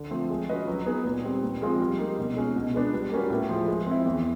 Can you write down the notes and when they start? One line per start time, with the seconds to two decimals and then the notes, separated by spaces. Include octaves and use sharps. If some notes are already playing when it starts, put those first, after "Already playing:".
Already playing: D3
0.11 F3 A3 C4
0.30 G#3
0.49 C#4 F#4 B4 D#5
0.68 F#3
0.86 B3 D#4 G#4
1.05 A#2
1.24 G3 C4
1.42 A#2
1.61 F3 G#3 C4 F4
1.80 G3
1.98 A#3 D#4
2.18 B2
2.36 G#3 C#4
2.56 B2
2.74 G#3 B3 D4
2.93 G3
3.12 A#3 C#4 F#4 B4
3.30 A2
3.49 F3 G#3
3.68 G#3
3.87 C4 E4
4.06 E2